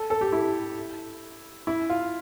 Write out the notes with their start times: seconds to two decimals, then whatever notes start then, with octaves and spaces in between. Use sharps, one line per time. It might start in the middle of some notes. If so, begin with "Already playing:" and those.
Already playing: A4
0.10 A4
0.21 G4
0.32 E4
1.67 E4
1.90 F4